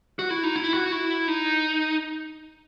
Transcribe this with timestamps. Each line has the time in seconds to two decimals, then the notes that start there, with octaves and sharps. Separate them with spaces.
0.19 F#4
0.31 E4
0.43 D#4
0.56 E4
0.74 F#4
0.92 E4
1.28 D#4